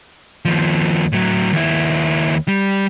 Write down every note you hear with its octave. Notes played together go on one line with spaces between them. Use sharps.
D#2 F3
A2 F#3
D#2 E4
G3